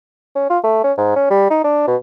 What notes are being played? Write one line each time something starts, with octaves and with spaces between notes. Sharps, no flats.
C#4
F4
A3
C#4
G#2
C#4
G3
D#4
D4
B2